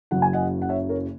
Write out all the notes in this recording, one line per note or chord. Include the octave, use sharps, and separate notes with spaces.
F#1 F#2 C#3 F#3 F#5
G#5
D#5 F#5
F#5
C#5 E5
A#4 C#5